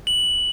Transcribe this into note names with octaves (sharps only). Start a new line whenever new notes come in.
F#7